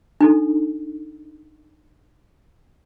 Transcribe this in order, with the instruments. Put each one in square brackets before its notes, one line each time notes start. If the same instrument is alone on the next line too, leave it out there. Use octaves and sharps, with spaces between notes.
[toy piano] D4 D#4 A4